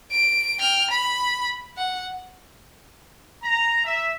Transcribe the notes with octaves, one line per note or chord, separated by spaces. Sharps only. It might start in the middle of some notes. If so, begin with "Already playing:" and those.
D7
G5 F6
B5
F#5
A#5
E5